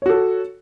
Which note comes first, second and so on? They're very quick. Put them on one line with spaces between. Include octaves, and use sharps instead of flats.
C#5 F#4 A4